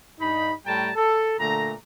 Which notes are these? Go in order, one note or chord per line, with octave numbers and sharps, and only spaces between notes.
G2 D#4 B5
A2 G3 A3 G5 A5 A#5
A4
A#2 D3 A3 A#5